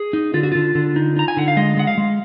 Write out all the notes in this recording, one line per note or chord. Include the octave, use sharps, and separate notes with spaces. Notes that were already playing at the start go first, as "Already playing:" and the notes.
Already playing: G#4
D#4
D3 F4
F#4
D3 F4
D3
D#4
D#4 A#5
G#5
D3 F#5
F5
G#3 D#5
G#3 F#5
F5
G#3